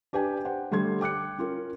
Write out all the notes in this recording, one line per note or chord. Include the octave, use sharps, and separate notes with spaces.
D4 G4 B4 G5 G#5
C5 F#5 G5
D3 G3 A3 C6 G#6
G5 D6 F#6 C#7
C#4 F4 A#4